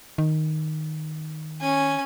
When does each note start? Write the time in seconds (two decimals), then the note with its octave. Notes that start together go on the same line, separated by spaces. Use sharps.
0.18 D#3
1.61 C#4 G#5